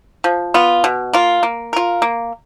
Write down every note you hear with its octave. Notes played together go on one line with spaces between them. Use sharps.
F3
B3 F4
B2
A#3 F4
A#3
F4 A#4
A#3